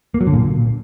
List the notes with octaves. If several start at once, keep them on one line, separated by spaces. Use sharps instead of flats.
A#3
F#3
D3
A#2